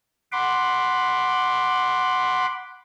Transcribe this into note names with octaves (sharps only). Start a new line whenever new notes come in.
F#5 B5 C6 D6